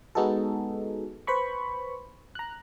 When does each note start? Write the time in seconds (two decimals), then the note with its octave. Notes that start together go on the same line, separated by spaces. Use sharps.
0.15 G#3 B3 D#4 F#4 G#4 A4
1.27 B4 C5 B5 C#6
2.35 A#5 F#6